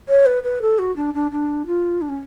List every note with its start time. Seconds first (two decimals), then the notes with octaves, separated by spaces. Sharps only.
0.09 C#5
0.26 B4
0.44 B4
0.62 A4
0.79 F#4
0.96 D4
1.14 D4
1.31 D4
1.66 F4
2.02 D4
2.09 C#4